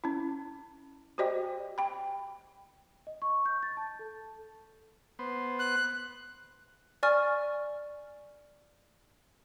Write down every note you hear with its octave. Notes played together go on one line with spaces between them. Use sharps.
C#4 E4
F#4 G4 C5 D5 D#5 G5
G5 B5
D#5
C#6
G6
A6
A5
A4
B3 C5
F#6
D5 G#5 C#6 F6 A6